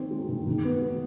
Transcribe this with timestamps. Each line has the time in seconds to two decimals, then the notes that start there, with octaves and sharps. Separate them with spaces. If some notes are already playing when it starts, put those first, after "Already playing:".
Already playing: D#3 C4
0.11 G#3
0.29 D#3
0.47 D#3
0.65 B3
0.82 G#3